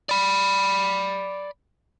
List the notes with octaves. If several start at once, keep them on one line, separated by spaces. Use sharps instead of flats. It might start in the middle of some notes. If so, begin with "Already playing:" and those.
D5 B5